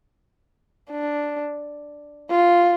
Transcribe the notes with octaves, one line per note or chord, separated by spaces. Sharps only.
D4
F4